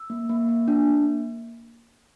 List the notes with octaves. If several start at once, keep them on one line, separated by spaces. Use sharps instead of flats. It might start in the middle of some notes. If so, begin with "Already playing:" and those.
Already playing: E6
A#3
A#3
A#3
D4
A#3